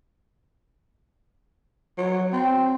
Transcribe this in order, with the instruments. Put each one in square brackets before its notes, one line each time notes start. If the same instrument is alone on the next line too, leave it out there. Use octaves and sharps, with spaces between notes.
[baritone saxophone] F#3
C4